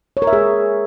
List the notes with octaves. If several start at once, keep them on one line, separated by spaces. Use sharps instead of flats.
C#5
A#4
E5
G#4